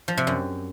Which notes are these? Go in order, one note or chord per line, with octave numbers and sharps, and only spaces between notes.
F3
C3
F#2